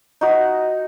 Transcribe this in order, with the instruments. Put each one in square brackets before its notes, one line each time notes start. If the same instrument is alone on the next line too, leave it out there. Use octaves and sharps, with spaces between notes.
[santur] D#4 F#4